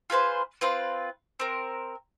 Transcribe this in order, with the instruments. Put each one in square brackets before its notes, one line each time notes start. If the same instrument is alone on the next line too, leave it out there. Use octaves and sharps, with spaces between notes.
[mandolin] F4 G#4 B4 C5
C4 F4 B4
C4 A#4